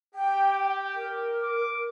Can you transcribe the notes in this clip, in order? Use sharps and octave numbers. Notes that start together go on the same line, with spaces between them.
G4 G5
A#4
D6